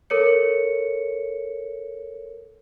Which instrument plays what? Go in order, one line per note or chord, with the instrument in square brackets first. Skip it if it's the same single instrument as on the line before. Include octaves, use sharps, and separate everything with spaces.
[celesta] A4 A#4 C#5 C#7